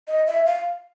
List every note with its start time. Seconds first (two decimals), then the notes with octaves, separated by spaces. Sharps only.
0.08 D#5
0.27 E5
0.46 F5